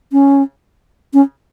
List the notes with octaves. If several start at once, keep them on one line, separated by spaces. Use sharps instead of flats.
C#4
C#4